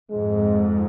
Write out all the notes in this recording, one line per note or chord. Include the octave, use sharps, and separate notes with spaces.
F2 G#2 G#3